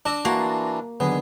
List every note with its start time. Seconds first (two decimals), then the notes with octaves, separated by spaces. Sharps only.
0.06 D4 E6 A#6 E7
0.25 E3 A#3 D4 F#4 A5 A#5 C6
1.00 D3 D#3 F#3 B3 G#4